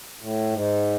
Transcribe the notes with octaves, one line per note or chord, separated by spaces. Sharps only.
A2
G#2